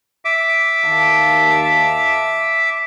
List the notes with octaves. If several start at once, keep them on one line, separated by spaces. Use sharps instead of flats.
E5 D6
D#2 F5 A5